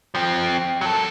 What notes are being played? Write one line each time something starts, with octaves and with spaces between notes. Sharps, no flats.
F3 C4
F#3 A4